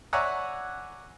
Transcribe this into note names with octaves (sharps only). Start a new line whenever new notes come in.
C#5 D5 E5 F#5 G#5 A#5